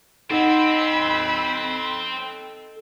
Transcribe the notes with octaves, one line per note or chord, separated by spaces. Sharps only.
C4 D#4 A4 D#5 F#5 B5 E6